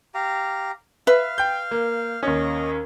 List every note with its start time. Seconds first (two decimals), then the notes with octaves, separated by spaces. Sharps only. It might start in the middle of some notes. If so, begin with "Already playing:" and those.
0.14 G4 F5 A#5
1.07 B4 E5 F5
1.38 G5 G6
1.71 A#3
2.23 D#2 C#4 D#5